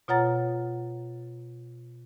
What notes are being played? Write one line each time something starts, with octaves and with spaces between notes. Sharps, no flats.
B2 F4 C#5 F#5 A#5 A6